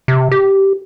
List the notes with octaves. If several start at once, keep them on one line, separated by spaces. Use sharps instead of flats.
C3
G4